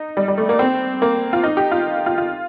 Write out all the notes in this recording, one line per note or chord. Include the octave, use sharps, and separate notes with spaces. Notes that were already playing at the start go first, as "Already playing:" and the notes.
Already playing: D#4
G3
G3
A3
A#3
C4
A#3
F4
D#4
G4
F4
F4
F4